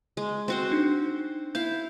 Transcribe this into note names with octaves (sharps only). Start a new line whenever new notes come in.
G#3
C4 F#4 C5
D4 D#4
E4 F5 G6